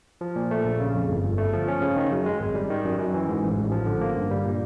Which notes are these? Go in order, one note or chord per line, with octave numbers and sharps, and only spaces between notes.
F3
A#2
A3
A#1
C#3
F2
G1
G1
A3
F3
C#4
C#3
D#3
F#2
G#3
G#1
G3
D#3
F#2
F#2
E3
G#2
A1
A1
F3
D3
A#3
G2
G3
A#2